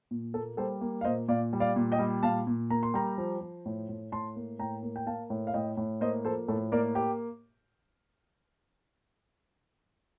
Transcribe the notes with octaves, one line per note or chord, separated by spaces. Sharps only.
A#2
A#3 A4
G3 A4 C5
A#3
F5
A#2 C5 D#5
A#2 D5 F5
G3
D5 F5
A#2
D#5 G5
G3
A#2 F5 A5
A#2
A#3 A#5
C6
G3 G5 A#5
F3
F3
A2
A2
A2 A5 C6
A#3
A2 G5 A#5
A#3
G5
A#3 F5 A5
A2
F5
A2 D#5 G5
A2
A#3 C5 D#5
F3 A4 C5
A2 A4
A#3 A#4 D5
G4